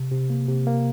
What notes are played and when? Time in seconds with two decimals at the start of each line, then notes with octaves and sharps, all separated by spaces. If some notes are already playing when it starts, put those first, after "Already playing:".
Already playing: C3
0.11 C3
0.30 A#3
0.48 C3
0.67 A#3